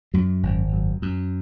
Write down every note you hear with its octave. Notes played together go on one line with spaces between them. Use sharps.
F#2 F#3
G#1
F#2
F#2